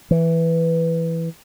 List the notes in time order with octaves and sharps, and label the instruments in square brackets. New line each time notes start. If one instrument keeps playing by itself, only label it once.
[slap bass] E3